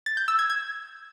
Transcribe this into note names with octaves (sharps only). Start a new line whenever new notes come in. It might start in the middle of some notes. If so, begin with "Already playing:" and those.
A6
G6
E6
G#6
G#6